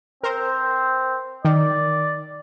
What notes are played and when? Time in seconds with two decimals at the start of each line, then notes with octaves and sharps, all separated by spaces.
0.23 C4 A#4 C5
1.45 D#3 D5